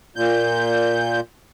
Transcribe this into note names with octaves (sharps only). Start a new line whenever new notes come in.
A#2 G6